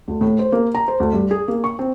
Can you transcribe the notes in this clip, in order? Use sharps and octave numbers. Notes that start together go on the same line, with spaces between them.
D2
A2
C5
A#3
A#5
C5
D2
G2
G#4
A#3
C#6
C4